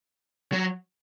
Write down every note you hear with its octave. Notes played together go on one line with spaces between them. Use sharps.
F#3